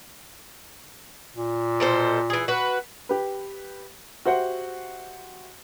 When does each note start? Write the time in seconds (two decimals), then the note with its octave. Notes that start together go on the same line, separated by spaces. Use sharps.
1.36 A#2
1.80 B2 A4 C5
2.30 E3 G#4
2.48 F#4 B4
3.09 G4 B4
4.25 F#4 G4 C5 E5 F#5